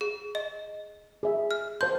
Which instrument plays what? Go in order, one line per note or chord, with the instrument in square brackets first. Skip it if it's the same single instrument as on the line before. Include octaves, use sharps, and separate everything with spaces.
[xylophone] G#4
D#5
[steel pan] G#4 E5
[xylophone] F6
[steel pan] C5 A5 C6 [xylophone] G6